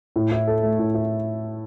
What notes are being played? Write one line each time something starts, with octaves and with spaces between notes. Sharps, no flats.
A2
E4
A4
A3
A2
E4